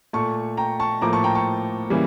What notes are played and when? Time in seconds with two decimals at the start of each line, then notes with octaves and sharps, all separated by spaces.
0.13 A#2 A3 A5 C#6
0.57 G5 A#5
0.80 A5 C#6
1.02 A2 F3 A#3 A#5 D6
1.13 A5 C#6
1.24 G5 A#5
1.35 A5 C#6
1.90 C#3 E3 G3 A#3